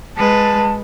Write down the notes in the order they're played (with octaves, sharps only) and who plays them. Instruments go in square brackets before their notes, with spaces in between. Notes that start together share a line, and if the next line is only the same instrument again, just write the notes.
[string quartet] G#3 B4 [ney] A5